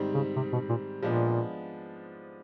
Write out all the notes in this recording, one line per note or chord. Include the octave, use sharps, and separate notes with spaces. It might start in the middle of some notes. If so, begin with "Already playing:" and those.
Already playing: G#2 D#3 G3 C4
C#3
C3
B2
A#2
A#2 F3 G#3 B3 D4